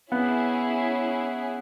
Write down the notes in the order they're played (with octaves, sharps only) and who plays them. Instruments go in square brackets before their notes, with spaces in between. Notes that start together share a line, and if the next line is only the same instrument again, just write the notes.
[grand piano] B3 [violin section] C#4 E4 G#4